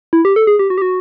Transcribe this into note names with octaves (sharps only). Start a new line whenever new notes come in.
E4
G4
A4
G#4
G4
F#4
G4
F#4